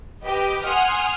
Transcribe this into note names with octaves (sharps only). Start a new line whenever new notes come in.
G4 B4 D#5 G5
F#5 G#5 C6 D#6 F6